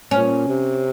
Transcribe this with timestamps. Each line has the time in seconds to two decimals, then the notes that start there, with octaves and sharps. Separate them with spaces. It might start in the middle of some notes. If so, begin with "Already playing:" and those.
0.11 A#2 C#4
0.48 C3